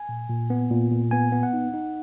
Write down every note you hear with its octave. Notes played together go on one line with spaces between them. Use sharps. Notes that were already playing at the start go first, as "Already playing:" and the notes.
Already playing: G#5
A#2
A#2
B3
A#2
A#2
B3 G#5
B3
F#5
D#4
D#4